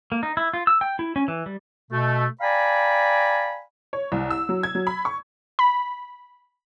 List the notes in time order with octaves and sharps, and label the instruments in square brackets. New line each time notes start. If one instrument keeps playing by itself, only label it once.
[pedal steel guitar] A#3
D#4
E4
F4
E6
G5
E4
C#4
E3
G3
[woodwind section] B2 A3
D5 F5 G5 G#5 A#5 B5
[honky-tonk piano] C#5
C2
E6
F#3
G#6
F#3
B5
C#6
[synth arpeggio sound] B5